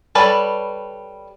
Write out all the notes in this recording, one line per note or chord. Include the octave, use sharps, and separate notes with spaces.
G3 A4 B4 C#5 D5